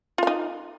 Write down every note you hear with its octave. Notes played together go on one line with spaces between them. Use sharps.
D#4 F4 F5